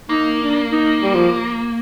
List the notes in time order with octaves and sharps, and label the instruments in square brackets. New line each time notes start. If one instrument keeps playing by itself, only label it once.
[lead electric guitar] A#3 [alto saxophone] D#4
[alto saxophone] D4
D#4
G3
F3